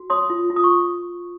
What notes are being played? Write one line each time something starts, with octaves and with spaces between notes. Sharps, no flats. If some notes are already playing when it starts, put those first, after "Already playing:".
Already playing: F#4
C#5 C6 D#6
F4
F4
D#6
C#6